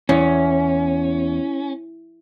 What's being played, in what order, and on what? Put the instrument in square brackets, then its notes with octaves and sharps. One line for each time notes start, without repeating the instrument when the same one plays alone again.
[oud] E2 [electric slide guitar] C#4